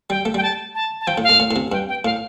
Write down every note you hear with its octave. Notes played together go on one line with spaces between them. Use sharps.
G3 G5
A3
G3 G5
A5
A5
A5
F3 G5
A2
F5
A2
A2
A2
C3
G2 G5
G5
A2 F5